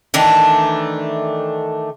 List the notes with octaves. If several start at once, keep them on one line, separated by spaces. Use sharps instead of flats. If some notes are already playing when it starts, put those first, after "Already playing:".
D#3 E3 A3 D4